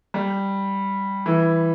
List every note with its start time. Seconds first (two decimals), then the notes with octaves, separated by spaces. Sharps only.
0.14 G3
1.26 E3